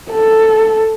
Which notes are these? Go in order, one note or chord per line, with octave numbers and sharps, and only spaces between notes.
A4